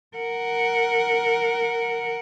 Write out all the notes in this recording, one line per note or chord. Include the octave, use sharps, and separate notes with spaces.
A#4 F#5